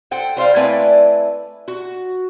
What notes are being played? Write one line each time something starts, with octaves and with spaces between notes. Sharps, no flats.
A4 C5 F#5 G5
G3 C5 E5 F5
A3 C4 E4 B4 D5 G#5
F#4